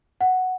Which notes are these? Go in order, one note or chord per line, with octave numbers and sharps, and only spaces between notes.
F#5